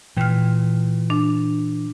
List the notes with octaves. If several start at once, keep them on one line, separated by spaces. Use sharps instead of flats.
A#2 E3 G5 F6
D4